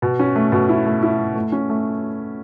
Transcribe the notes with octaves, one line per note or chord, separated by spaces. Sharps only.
B2
C#4
A3
B2
E4
A3
E4
A3
A3
C#4
A3